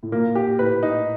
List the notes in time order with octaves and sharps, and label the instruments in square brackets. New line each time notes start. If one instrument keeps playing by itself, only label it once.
[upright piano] A2
[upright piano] A#2 [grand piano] A#3
[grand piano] G4
[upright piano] A2 [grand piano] B4
[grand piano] D#4